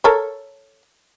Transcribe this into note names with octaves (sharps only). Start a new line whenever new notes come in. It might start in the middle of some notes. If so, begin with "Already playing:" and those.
A4 A#4 C#5